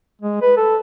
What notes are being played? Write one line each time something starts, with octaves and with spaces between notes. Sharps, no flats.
G#3
B4
A4